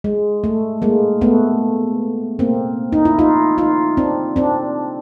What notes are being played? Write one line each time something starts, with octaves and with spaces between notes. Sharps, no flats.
G#3
A3
G#3 A#3
A3 B3
A#3 C4
D#4
E4
D#4 F4
D#4 F4
C4 D4
C4 D4